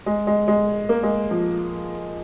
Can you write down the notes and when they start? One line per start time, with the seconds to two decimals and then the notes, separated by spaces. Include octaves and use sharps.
0.06 G#3
0.27 G#3
0.48 G#3
0.89 A#3
1.03 G#3
1.31 F3